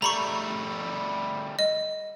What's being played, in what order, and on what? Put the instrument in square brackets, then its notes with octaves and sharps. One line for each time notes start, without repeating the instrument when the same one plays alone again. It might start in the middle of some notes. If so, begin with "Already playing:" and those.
[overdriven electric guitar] G3 A3 [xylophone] A#5 B5 C#6
[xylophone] D#5